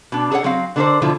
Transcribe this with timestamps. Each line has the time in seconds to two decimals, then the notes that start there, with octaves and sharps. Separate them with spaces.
0.12 B2 D4
0.31 G#4 A4 C#5 F#5
0.44 F#3 C4 F#4 F5
0.76 D3 B3 D4 A4 A#4 C5
1.02 B2 D3 F3 E4 F4